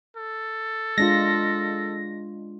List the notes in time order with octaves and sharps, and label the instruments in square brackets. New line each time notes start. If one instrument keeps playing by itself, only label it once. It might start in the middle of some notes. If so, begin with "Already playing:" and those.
[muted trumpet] A4
[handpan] G#3 D4 F4 [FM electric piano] A#6